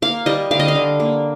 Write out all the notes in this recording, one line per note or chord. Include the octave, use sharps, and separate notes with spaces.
A#3 F5
G3 D#5
D3 F5
D#5
F5
D3
A#3